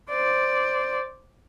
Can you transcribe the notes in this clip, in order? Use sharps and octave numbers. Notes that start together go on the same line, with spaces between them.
C5 D5